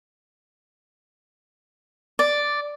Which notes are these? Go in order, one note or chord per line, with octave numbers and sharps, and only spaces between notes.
D5